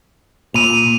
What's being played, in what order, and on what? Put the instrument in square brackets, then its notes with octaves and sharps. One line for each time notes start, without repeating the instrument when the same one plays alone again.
[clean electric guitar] A#2 [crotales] D#7 F7